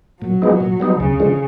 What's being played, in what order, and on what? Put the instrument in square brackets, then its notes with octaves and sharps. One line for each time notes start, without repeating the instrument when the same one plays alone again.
[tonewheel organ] A#2 [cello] F#3
[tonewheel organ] F3 G#3 B3 D#4
A#2
G3 B3 D#4
[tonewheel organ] D2 [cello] C#3
[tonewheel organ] D3 F3 G#3